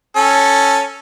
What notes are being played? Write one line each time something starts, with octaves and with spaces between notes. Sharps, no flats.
C#4 A4